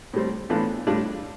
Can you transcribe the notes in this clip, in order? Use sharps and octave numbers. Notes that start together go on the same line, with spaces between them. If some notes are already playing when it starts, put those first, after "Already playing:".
A2 G3 C4
A2 E3 B3 D4 F4
A2 G3 D4 F4